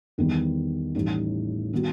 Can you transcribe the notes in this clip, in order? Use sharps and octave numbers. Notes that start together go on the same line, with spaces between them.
E2 D#3 G3 B3
A1 A2 G3 D#4
D#3 G3 B3 F#4